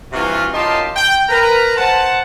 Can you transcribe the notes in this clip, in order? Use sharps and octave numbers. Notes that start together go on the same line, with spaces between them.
G2 C3 E3 F4 F#4
F#2 D#4 F4 G4 A5 C6
G5
A#4 B4 A#5
C5 F#5 A5